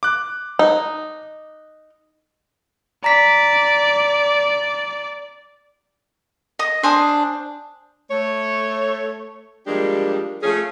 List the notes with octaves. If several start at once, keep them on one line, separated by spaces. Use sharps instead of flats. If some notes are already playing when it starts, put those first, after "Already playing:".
D6 F#6
D#4
D5 A#5 B6
D#5 D#6
D4 C5 G#5 D#6
A3 C#5
F3 G3 G#3 A#3 D4 G4
F3 A3 C#4 G#4